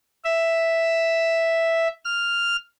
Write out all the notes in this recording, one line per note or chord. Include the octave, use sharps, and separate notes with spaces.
E5
F6